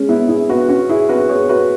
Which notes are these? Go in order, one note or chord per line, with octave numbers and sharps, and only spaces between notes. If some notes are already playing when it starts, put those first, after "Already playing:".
Already playing: G#3 C#4
B3 E4
E4 G#4
F#4 B4
C#4 F#4
E4 G#4
F#4 B4
G#4 C#5
F#4 B4